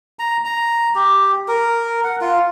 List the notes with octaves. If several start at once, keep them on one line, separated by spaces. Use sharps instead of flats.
A#5
A#5
G4
A#4
F#5
F4